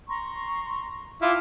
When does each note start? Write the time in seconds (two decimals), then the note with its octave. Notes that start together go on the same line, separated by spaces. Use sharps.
0.07 A#5 C6 C#6
1.22 E4 F4 G5 A5 D6